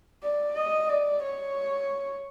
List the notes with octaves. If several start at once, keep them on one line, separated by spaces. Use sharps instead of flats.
D5
D#5
D5
C#5